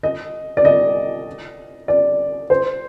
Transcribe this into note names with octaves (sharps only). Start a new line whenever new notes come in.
D#5
D5
D#5
D5
C5